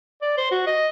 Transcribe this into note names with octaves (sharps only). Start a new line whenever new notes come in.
D5
C5
F#4
D#5